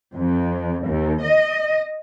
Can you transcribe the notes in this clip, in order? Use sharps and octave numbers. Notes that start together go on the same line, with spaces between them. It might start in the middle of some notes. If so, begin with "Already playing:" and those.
F2
D#2
D#5